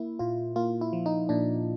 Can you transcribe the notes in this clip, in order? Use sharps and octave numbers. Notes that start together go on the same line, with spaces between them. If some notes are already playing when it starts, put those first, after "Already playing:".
Already playing: A#3 E4
A#2 F4
A#3 F4
E4
F3
D#4
A#2 D4